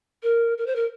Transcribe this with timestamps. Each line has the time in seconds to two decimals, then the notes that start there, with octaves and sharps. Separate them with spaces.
0.23 A#4
0.57 A#4
0.66 C5
0.75 A#4